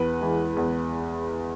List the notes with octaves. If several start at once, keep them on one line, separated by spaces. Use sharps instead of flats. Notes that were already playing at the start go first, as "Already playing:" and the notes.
Already playing: E2 B4
E3 G#3
E2